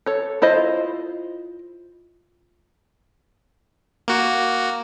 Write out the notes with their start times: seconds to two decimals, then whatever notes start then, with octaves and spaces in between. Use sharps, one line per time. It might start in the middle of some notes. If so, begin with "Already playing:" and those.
0.06 A4 C#5
0.42 E4 F4 C5 D#5
4.08 A#3 F#4